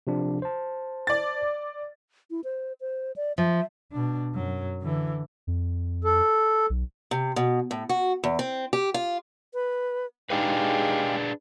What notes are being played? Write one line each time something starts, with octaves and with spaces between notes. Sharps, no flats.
C3 F3 D4
C5 A5
D5 A6
E4
C5
C5
D5
F3 E5
B2 D4
F#2 F#3
D3 E3
F2
A4
B1
C3
B2
A2
F#4
E2
C4
G4
F4
B4
G#3 D4 D#4 G4 G#4 B4 F5